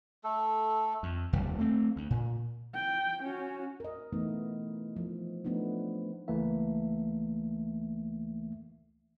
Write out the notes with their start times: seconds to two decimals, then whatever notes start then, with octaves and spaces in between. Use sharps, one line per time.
0.24 A3 A4
1.03 F2
1.33 F1 D#2 C3 G3
1.59 A3 C4
1.96 D2
2.10 A#2
2.75 G5
3.23 C#4 F#4
3.80 A#4 D#5
4.13 E3 A3 B3 D#4
4.96 F3
5.45 F3 A3 B3 D4 D#4
6.28 C#2 E3 A3 A#3 E5